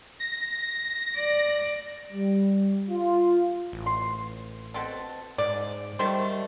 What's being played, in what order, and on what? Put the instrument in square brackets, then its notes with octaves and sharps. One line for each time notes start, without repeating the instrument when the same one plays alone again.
[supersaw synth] A#6
[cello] D5
[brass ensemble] G3
F4
[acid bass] A1
[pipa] C6
B2 C4 A4
[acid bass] G#2 [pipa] D5
[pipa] D#3 A3 C5 [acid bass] G3